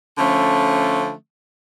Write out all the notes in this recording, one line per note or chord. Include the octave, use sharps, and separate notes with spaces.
D3 F3 A3 C#4